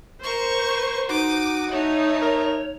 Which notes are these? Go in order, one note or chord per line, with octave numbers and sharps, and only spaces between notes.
A#4 C5 C#6
D#4 F#4 D6 D#6
A3 D#4 C#5
A#4